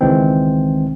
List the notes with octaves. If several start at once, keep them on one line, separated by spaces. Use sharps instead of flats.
C#2 D#3 E3 G#3 C4